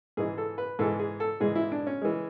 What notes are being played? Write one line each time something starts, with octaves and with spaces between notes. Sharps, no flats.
G#2 E3 G#3 G#4
A4
B4
G#2 E3 G#3 A4
G#4
A4
G#2 E3 G#3 G#4
E4
D4
C#4
E3 G#3